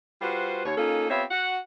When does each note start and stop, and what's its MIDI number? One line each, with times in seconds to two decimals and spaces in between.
0.22 0.64 55
0.22 0.64 65
0.22 0.64 66
0.22 0.64 71
0.22 0.64 72
0.65 0.76 39
0.65 0.76 73
0.77 1.07 58
0.77 1.07 61
0.77 1.07 63
0.77 1.07 65
0.77 1.07 69
1.10 1.24 59
1.10 1.24 60
1.10 1.24 65
1.10 1.24 67
1.10 1.24 73
1.10 1.24 76
1.31 1.58 66
1.31 1.58 78